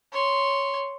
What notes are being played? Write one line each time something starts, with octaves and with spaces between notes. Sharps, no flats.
C#5 C6